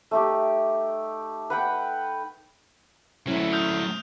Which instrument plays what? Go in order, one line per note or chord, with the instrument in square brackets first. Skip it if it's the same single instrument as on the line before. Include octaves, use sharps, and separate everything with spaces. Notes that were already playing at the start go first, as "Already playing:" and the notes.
[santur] A3 D#4 G4
B4 F#5 G5
[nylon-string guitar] D2 C#4 [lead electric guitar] F#3 A3 [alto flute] E4
[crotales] D#6 F6 G6